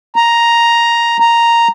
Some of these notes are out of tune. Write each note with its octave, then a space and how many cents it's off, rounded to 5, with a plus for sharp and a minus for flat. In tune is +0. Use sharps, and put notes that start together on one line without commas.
A#5 +5
A#5 +0